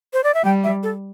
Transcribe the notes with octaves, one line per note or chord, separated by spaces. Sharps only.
C5
D5
E5
G3 G5
E5
A4